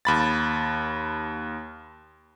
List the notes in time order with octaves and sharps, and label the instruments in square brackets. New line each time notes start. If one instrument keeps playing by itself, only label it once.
[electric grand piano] D#2 B5 A6